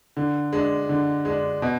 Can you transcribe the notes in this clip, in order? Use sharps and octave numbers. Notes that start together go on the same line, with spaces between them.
D3
G#3 D4
D3
G#3 D4
B2